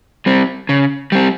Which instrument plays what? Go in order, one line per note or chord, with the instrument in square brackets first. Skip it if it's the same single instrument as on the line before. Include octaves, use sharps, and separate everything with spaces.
[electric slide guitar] G3 C4
C#3
G3 C4